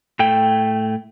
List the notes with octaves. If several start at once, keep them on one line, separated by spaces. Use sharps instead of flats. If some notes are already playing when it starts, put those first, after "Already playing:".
A2 A3 G5